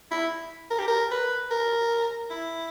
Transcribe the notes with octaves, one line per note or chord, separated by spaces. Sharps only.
E4
A#4
G4
A#4
B4
A#4
E4